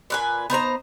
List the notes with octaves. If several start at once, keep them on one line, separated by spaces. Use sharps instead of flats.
A#2 B4 G#5
B3 D#4 C5 A#5